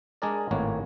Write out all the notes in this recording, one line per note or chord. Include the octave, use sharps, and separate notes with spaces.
G#3 D4 G#4 A#4 D5
G#1 A2 A#3 B4 C#5